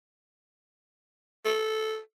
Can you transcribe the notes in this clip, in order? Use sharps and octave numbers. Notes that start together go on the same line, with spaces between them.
A4